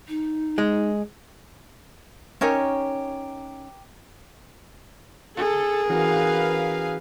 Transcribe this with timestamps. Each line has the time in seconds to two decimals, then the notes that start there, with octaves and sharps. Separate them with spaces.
0.09 D#4
0.58 G#3
2.41 C#4 D#4 G4 A#4 C#5 G#5
5.37 G#4 A4
5.90 E3 C#4 F#4 A#4 B4 F5